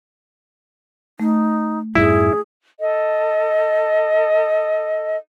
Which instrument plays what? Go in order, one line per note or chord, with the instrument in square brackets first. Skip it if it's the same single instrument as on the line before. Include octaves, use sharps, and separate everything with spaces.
[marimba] A3 [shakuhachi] D#4
[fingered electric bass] F2 G#2 G3 [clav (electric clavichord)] E4 [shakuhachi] G#4
[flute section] A4 D#5